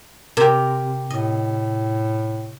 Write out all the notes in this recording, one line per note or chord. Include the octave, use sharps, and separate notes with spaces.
C3 G4 A#4
A2 D#5